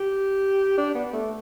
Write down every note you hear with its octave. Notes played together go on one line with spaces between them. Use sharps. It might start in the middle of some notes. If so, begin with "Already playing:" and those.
Already playing: G4
D4
B3
A3